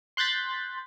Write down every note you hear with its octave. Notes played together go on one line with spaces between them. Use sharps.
C6 F#6 G6 A6 B6